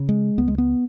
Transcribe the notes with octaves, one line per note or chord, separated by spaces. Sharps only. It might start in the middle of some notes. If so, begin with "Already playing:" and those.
Already playing: C#3
G#3
C#2 B3
G#3
B3